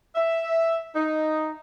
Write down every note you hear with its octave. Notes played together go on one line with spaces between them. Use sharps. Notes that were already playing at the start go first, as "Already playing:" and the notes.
E5
D#4